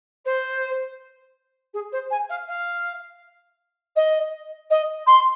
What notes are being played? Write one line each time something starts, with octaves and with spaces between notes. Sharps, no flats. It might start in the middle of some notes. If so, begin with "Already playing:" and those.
C5
G#4
C5
G#5
F5
F5
D#5
D#5
C6